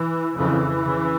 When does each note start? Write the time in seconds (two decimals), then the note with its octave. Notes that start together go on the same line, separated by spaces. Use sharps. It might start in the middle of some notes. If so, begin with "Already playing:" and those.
Already playing: E3
0.36 F2 C#3 E3
0.85 C#3